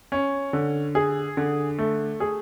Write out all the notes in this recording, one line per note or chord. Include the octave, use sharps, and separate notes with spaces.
C#4
D3
G#4
D3
A3
G#4